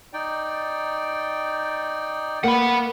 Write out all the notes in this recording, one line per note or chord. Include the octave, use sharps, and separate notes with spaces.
D#4 D5 G5
A#3 F#5 B5